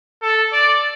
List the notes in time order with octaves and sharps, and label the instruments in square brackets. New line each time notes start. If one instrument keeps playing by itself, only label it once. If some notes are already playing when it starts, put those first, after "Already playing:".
[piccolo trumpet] A4
D5